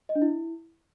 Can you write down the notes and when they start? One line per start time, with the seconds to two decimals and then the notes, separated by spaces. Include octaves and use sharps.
0.09 D#5
0.15 D4
0.22 E4